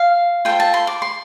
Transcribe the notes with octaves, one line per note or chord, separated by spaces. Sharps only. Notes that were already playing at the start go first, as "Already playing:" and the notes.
Already playing: F5
F4 A4 C5 G5
A5
C6
D6
C6